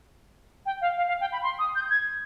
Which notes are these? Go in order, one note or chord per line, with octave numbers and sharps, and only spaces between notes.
G5
F5
F5
F5
G5
B5
C6
D#6
G6
G#6